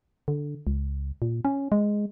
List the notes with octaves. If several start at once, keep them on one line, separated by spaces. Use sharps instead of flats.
D3
C#2
A#2
C#4
G#3